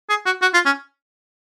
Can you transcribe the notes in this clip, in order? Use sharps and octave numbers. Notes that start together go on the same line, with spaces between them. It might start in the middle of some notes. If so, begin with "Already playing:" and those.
G#4
F#4
F#4
F4
C#4